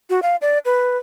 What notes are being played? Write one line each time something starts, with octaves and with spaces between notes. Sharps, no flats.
F#4
F5
D5
B4